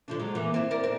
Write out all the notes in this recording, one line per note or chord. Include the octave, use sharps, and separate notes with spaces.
D3 F3 D4
G#2 F#3 G#3
E3 A#3
C4 E4
D4 A#4
C4